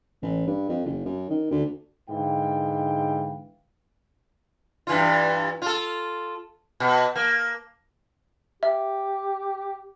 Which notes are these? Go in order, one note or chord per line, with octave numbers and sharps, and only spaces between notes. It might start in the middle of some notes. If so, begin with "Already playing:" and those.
A1
G2
F2
F#1
F#2
D#3
D2
G#2 D3 E3 F5 G5
G2 E3 F4
F4 A4
B2
A#3
G4 E5